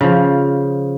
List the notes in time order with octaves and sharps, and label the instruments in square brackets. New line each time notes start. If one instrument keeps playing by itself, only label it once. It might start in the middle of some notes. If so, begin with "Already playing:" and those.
[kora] C#3 F3